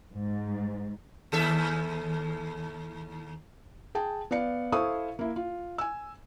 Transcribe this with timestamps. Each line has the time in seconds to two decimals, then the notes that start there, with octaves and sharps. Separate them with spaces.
0.13 G#2
1.32 D#2 A4 E5
3.95 G#4 G5 A5
4.31 B3 D5 F5 C#7
4.72 E4 A4 C5 F5 C#6 D#6
5.19 A#3 E4
5.36 F4
5.78 G#5 E6